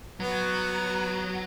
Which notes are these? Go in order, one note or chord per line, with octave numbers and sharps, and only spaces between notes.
F#3 B3